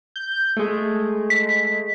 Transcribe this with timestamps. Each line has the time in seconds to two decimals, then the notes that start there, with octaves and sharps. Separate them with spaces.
0.16 G6
0.56 G#3 A3
1.30 B6